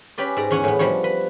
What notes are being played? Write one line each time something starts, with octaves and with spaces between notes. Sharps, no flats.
C#4 G4 B4 D5
G#2 D5 A#5
E2 C#4 C#5 F#5 G#5
A2 B3
F3 G3 D4 C#5
B4